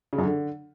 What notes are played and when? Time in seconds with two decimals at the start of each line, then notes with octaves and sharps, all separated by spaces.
0.13 C#3
0.18 F#2
0.24 D3